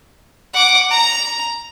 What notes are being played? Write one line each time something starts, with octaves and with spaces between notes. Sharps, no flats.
F#5 D6
A#5